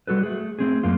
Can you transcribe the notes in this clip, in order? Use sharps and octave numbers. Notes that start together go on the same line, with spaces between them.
G3 F#4 A4 B4
A3 G#4
A3 C4 G#4
F#2 A#3 F4